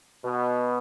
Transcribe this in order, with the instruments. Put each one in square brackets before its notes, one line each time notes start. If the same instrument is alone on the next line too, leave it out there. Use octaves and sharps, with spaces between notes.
[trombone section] B2